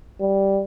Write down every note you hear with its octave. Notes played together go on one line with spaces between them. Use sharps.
G3